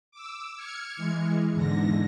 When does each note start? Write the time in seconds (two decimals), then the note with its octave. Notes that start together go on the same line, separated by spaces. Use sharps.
0.11 D6 E6
0.57 F6 G#6 C#7
0.97 E3 G#3
1.52 E2 G#2 D3 A#6